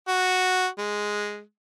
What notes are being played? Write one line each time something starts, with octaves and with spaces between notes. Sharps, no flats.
F#4
G#3